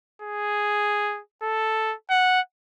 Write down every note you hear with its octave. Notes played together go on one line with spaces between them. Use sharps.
G#4
A4
F#5